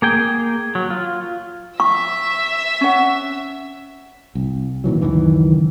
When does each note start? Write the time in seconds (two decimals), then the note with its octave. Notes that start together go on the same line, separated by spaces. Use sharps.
0.02 A#3 G#4 G5
0.75 F#3
0.90 F4
1.80 E5 C#6 E6
2.81 C#4 F#5
4.35 C2
4.84 A#2 D#3 E3 F#3
5.02 C#2 F#2 D#3 E3